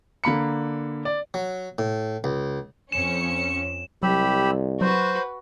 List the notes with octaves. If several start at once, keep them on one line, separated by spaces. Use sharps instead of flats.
D3 A#3 B5 C#7
D5
F#3
A2
C#2
F2 C#4 C#7 E7
C2 F#3 G4 B5 E6
F#3 F#4 B4 C5